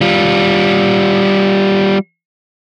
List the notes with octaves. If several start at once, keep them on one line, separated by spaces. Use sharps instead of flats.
G3 F4